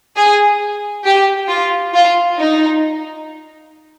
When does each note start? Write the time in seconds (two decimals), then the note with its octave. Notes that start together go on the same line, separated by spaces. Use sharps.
0.16 G#4
1.05 G4
1.49 F4
1.94 F4
2.39 D#4